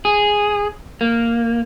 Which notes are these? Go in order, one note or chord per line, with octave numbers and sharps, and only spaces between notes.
G#4
A#3